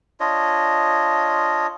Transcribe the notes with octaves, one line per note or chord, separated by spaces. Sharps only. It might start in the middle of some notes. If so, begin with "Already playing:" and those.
D4 F4 C#5 D#5